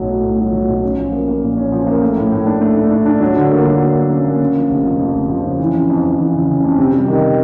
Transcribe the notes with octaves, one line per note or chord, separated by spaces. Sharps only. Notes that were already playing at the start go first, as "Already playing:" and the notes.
Already playing: B1 A2 F#3
A3
A2
F#3
F#3
B1
C#4
F3
A#3
A#3
A#2
C#4
F3
A#3
A3
A2
A2
D4
A3
D4
D4
D4
F#3
D3
A#3
F#3
A#3
A#3
C#4
A#3
C#3
F3
F1
F3
F2
F1
F3
C#3
E3
F2
F2
F2
E3
C#3
C#3
F2
C3
G3
D#3